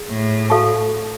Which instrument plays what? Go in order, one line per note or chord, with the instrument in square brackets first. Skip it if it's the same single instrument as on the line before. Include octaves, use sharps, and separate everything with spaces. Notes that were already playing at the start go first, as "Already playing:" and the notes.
Already playing: [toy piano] G#4
[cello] A2
[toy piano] F#4 A4 F5 A5 C#6